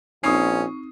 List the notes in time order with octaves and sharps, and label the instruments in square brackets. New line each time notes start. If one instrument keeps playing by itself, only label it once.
[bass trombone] A#1 [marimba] C4 D#4 [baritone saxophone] C#4 [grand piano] C#6 D#6 C7